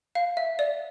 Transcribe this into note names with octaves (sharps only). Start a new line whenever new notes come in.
F5
E5
D5